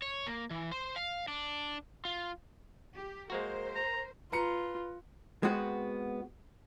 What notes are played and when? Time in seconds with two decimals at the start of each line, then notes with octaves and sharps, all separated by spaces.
0.02 C#5
0.27 A#3
0.51 E3
0.72 C5
0.96 F5
1.28 D4
2.05 F4
2.96 G4
3.30 G#3 A#3 F#4 A#4 C5
3.76 A#5
4.32 F4 B4 A#5 C#7
5.43 G#3 B3 C4 F#4